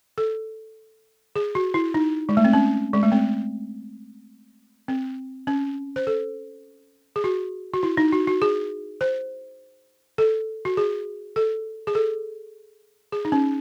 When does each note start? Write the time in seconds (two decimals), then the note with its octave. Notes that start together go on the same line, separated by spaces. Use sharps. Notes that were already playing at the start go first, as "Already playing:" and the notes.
0.18 A4
1.36 G#4
1.55 F#4
1.74 E4
1.94 D#4
2.29 G#3
2.37 A3
2.45 C4
2.53 C#4
2.94 G#3
3.03 A3
3.12 C4
4.88 C4
5.47 C#4
5.96 C5
6.07 A4
7.16 G#4
7.24 F#4
7.74 F#4
7.83 E4
7.97 D#4
8.13 F#4
8.27 F#4
8.42 G#4
9.01 C5
10.18 A4
10.65 F#4
10.77 G#4
11.36 A4
11.87 G#4
11.95 A4
13.12 G#4
13.25 D#4
13.32 C#4